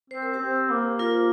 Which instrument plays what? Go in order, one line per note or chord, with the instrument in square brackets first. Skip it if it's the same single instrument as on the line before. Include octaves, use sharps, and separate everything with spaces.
[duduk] C4 [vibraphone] C5
[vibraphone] A#4
G4 C5
[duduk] C4
A#3
[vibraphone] F4 A#4